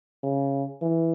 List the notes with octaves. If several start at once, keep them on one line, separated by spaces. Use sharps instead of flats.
C#3
E3